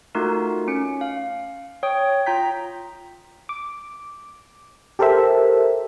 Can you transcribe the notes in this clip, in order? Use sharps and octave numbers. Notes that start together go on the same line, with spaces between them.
A3 D#4 F4 F#4 A#4
C#4 C#7
F5
C#5 G5 D#6
F4 G5 A#5 G6 B6
D6
G4 A4 A#4 C5 E5